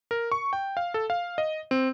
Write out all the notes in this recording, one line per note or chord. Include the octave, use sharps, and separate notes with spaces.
A#4
C#6
G5
F5
A4
F5
D#5
C4